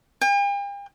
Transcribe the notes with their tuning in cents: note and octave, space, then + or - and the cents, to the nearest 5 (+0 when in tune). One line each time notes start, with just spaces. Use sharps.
G5 +45